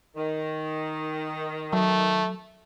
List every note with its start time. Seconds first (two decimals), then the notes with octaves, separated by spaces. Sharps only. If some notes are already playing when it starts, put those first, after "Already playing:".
0.16 D#3
1.73 F#3 A3